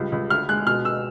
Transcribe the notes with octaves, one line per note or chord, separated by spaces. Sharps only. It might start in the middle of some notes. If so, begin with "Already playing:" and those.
Already playing: C#2 G3
C#2
D2 F6
G#3 F#6
B2 F6
B2 E6